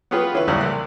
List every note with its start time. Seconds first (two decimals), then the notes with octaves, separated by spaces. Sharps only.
0.11 B3 C#4 F4 G4 G#4 B4
0.33 D3 E3 C#4 E4 B4
0.48 E2 A2 C#3 G3 C#4
0.61 C2 F#6